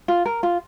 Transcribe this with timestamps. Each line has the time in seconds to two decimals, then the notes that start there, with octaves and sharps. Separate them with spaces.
0.08 F4
0.26 A#4
0.43 F4